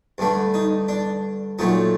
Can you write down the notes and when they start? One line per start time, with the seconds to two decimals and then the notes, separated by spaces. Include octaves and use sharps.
0.18 G2 D3 A3
0.54 D#4
0.88 D4
1.59 A#2 F#3 A3 D#4